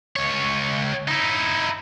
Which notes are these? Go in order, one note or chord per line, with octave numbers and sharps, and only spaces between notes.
C#2 C#5
D#4 E4